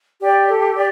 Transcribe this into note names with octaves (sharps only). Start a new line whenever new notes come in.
G4 D5 G5
A4
D5